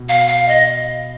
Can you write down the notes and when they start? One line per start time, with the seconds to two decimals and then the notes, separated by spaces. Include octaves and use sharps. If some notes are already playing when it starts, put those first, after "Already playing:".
Already playing: B2
0.08 F5
0.27 F5
0.48 D#5